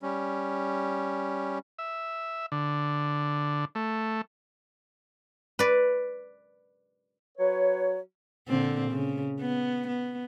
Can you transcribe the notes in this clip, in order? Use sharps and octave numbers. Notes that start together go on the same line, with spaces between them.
G3 C#4
E5
D3
A3
B4 D5
F#3 B4 C#5
A#2 D3 C4
C#3
B3
B3